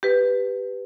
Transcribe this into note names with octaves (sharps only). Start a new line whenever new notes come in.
G4 B4